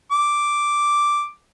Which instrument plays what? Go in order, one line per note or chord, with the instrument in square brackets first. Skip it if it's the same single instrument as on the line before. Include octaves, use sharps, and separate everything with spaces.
[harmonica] D6